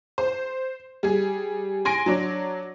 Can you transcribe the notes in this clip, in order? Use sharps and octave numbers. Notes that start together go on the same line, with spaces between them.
C5
G3 G#4
G#5 C6 A#6 D7
F#3 D4 C#5